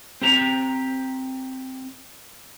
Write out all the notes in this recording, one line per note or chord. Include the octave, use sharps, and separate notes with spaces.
C4 G4 A#5